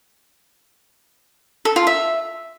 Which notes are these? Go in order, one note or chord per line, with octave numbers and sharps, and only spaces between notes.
A4
F4
E5